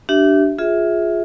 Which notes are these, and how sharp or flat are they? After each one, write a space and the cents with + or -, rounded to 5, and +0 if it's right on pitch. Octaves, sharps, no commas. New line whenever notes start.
D4 +0 G4 -35 E5 +0
F4 +10 G#4 +0 E5 -15